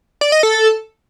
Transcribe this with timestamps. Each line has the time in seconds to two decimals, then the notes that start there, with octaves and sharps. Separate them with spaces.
0.21 D5
0.32 D#5
0.43 A4